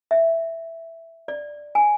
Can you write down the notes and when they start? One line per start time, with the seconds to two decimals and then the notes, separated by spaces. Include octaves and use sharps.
0.11 E5
1.28 D5
1.75 G#5